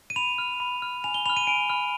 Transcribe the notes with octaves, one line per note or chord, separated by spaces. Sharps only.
D#7
B5 F7
F6
B5
F6
G#5 F7
G7
B5 F6 F7
D#7
G#5 D7
B5 F6